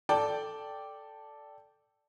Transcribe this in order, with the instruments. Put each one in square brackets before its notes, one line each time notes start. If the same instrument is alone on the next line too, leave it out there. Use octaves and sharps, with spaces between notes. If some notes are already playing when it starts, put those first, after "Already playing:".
[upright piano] A4 D5 G5 A5